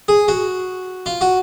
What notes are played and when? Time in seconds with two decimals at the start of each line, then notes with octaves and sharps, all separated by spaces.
0.08 G#4
0.28 F#4
1.06 F4
1.21 F#4